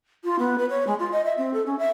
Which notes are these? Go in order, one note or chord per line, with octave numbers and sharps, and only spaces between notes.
F4
B3
B4
C#5
G#3
F4
D#5
E5
C4
A4
C#4
E5